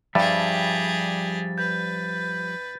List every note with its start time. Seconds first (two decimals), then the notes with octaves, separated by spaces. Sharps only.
0.15 G2 F3 G3 G4 G#4 E5 A6
1.58 B4 G6